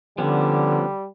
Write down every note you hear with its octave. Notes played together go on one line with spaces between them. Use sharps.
D3 F3 G3 B3 C#4